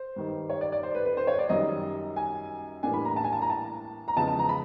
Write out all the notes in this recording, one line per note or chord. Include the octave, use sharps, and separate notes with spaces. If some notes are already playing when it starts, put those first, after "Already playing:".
Already playing: C5
G2 D#3 G3
C#5
D5
D5
C5
B4
B4
C5
C#5
D5
F#2 D#3 G3 D#5
G#5
A2 E3 G3 A#3 D4 G#5
B5
A#5
A5
G#5
A5
A#5
A5
A#5
E2 C#3 F3 G#3 B3 A5
A5
A#5
B5